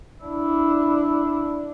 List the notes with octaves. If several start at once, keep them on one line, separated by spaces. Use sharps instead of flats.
D4 E4